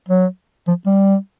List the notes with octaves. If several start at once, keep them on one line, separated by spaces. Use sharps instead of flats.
F#3
F3
G3